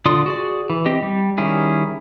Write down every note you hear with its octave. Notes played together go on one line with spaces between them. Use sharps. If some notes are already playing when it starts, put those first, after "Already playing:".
D3 F4 D5 C6 D#6
F#4 G#4 D5
E3
C4 G4 D#5
G3
D#3 G3 C#4 E4 G#4